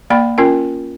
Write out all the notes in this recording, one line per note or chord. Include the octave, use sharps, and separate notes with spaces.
A#3 D5 G5 B5
C#4 F4 A#4 G5